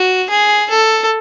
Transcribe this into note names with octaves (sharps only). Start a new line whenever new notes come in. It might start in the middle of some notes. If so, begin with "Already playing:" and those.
Already playing: F#4
G#4
A4